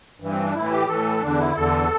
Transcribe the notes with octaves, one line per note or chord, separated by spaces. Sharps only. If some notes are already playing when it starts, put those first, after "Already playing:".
G2 E3
C4
D4
A2 E3 E4
G4
A2 E3 A4
E2 D3 D4
E4
E2 D3 A4